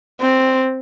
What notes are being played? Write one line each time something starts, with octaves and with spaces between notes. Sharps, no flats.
C4